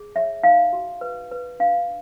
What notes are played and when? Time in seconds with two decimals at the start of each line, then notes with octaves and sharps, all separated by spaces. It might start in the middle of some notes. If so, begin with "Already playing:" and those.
Already playing: G#4
0.15 C#5 E5
0.43 D#4 F5
0.73 F#4
1.01 B4
1.31 B4
1.60 D4 F5